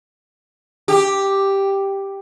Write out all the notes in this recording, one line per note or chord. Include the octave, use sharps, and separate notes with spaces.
G4